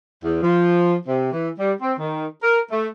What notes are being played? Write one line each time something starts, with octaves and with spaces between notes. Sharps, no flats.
E2
F3
C3
E3
G3
C4
D#3
A#4
A3